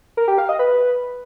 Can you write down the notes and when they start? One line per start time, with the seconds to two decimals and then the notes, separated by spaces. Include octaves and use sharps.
0.17 A#4
0.28 G4
0.38 F5
0.49 D#5
0.59 B4